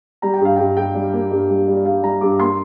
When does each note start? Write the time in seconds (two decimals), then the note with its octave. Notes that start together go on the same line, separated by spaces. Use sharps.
0.22 G3 A#5
0.33 G5
0.41 G2 F5
0.56 G2 G5
0.77 G2 G5
0.95 G3
1.13 A#3
1.31 G2
1.50 G3
1.67 G3
1.76 D5
1.85 G3 F5
2.03 G3 A#5
2.21 G2 D6
2.40 A#3 C6